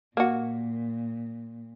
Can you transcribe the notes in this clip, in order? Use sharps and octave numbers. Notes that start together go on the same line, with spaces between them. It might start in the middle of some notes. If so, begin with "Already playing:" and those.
A#2 A#3 F#4